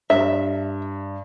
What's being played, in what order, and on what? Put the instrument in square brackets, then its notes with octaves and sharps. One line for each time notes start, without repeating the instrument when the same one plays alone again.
[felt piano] G2 [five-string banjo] E5